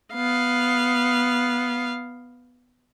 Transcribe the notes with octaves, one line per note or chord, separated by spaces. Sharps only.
B3 F5